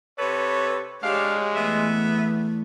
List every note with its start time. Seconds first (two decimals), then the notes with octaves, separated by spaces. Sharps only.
0.19 C3 A4 B4 C#5
1.03 G#3 D4 G4 C#5 F5
1.56 E2 A3 B3 E5